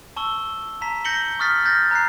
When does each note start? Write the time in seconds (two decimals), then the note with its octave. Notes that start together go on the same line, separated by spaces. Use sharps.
0.16 A5 C#6 E6 G7
0.81 A5 A#5 B6
1.05 G6 A#6 C#7 F#7 G7
1.39 C#6 D#6 F6 A6 B6
1.66 F6 G6 A6 A#6
1.91 A#5 F#6 C7